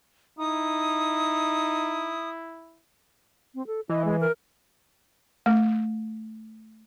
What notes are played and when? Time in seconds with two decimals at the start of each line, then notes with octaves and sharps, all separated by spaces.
0.39 D#4 E4 D#6
3.55 C4
3.67 A4
3.89 E3 D#5
4.05 G#3
4.21 A#4
5.46 A3